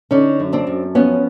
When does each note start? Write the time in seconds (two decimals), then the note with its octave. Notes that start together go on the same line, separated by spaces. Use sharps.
0.11 D3 C#4 D#4
0.40 F#2
0.53 C4 D4
0.67 F#2
0.95 F3 B3 C#4